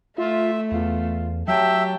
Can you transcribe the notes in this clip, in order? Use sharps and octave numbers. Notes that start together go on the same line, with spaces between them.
A3 F4 E5
E2 F4
F#3 G4 E5 G5 A5